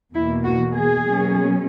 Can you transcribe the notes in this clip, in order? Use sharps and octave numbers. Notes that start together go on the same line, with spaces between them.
E2 B2 A#3 E4
F#4
G#4
B2 F#3 A#3 C#4